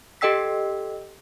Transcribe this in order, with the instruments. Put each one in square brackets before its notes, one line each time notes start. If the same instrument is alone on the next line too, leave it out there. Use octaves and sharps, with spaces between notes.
[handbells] G4 A4 D#5 G5 E6 B6